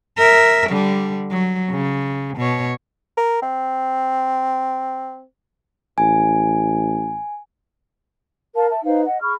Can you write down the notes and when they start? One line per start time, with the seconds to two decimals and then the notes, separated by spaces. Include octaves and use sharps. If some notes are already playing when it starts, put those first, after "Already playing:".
0.18 A#4 E5
0.70 D3 G3
1.31 F#3
1.71 C#3
2.37 B2 C#5
3.17 A#4
3.42 C4
5.98 A1 G#5
8.55 A#4 F5 A5
8.69 E5 A5
8.84 D#4 B4 C5 F5
9.06 D#5 F#5
9.21 G#4 B5 C#6 F6